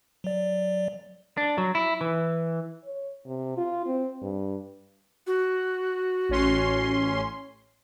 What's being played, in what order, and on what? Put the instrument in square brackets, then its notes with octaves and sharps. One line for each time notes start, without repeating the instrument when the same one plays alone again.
[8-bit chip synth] F#3 D5
[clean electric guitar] D4
F#3
E4
E3
[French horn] C#5
C3
F4
C4
G2
[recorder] F#4
[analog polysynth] A1 C#4 C6